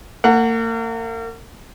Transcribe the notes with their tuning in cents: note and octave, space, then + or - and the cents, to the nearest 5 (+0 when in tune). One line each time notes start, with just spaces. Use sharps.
A#3 -40 F#5 +0